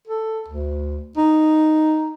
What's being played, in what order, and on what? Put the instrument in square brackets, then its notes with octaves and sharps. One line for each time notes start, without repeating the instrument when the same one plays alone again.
[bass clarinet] A4
D2
D#4